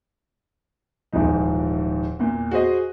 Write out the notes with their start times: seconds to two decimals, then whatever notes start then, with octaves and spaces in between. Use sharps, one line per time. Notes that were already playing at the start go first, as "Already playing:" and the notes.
1.13 D#1 G#2 E3 F3 D#4
2.19 E2 A#2
2.51 F#4 G#4 C5 D#5